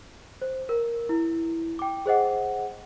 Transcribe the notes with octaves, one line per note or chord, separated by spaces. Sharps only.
C5
A#4
E4
G5 D6
G#4 C5 D#5 F#5